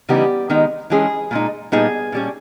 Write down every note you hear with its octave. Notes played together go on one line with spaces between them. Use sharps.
C#3 E3 G3 B3 D#4 G4
D#3 G#3 B3 D#4
E3 G#3 C#4 G#4
A#2 G#3 D#4
A#2 G3 B3 D#4 G#4
A#2 G3 C#4